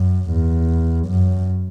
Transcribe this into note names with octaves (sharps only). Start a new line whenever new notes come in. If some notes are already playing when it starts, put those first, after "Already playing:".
Already playing: F#2
E2
F#2